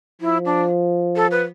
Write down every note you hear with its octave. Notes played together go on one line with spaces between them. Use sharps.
F3 E4
D4
A4
B4